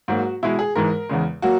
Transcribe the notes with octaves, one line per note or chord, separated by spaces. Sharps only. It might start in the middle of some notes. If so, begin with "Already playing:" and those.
G#2 F#3 A#3 F#4
B2 G#3 E4
G#4
G#2 E3 G#3 A#4
E2 C#3 G#3
F#3 A#3 F#4